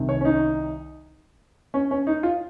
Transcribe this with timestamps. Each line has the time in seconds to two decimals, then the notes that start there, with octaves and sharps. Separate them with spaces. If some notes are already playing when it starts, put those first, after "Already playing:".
Already playing: C2 C3 D#3
0.09 C#5
0.21 C#4
0.25 D#4
1.74 C#4
1.91 C#4
2.07 D#4
2.23 F4